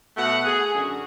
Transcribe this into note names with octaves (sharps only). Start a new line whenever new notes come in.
B2 A3 F#5
G#4
F#2 D3 F#4